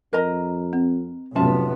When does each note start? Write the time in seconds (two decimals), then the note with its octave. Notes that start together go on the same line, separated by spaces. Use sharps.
0.13 F2 A#4 D#5 A#5
0.73 C4
1.36 F1 A2 F#3 B3 C#4 F4 E5 A5